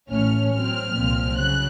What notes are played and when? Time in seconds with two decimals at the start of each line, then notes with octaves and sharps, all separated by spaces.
0.11 A1 A2 A3 C#4 F6
0.53 A2 F#3 C4 F6
0.95 C2 A#2 F3 C4
1.37 C#3 F#3 F#6